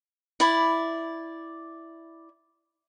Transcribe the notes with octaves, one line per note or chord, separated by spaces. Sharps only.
E4 D5 B5